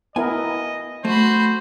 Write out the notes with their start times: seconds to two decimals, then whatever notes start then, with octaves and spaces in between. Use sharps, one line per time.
0.16 B3 E4 A#4 D#5 G#5
1.05 A3 F#4 C5 B5